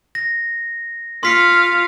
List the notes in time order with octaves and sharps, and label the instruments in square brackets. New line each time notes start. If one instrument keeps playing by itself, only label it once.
[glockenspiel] A#6
[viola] F4 F5 [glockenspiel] C6 B6 C#7